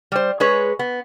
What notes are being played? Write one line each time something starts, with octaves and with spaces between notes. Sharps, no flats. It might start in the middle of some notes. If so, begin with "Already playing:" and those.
G3 C5
G#3 G#4 B4 C#5
B3